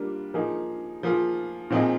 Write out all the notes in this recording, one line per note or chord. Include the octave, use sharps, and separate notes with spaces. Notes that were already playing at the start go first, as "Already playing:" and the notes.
Already playing: G3 A#3 D4 F4
F3 A#3 D#4 G#4
F3 A#3 F4 G#4
A#2 F3 C4 D#4 G#4